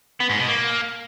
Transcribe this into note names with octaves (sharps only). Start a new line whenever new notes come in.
B3
G#2
B2
A#3